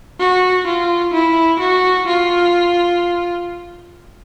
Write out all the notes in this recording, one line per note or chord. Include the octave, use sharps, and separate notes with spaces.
F#4
F4
E4
F#4
F4